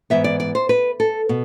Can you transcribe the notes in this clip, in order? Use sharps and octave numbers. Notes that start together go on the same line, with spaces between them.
G#2 E3 B3 E5
D5
D5
C5
B4
A4
B2